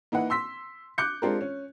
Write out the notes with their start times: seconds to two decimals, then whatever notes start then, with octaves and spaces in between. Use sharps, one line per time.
0.12 A#3 D#4 E4 B4 F#5
0.30 C6 E6 B6
0.98 D6 F#6 G6 C#7
1.22 G#3 C4 D4 F4 G4 A#4
1.41 C#4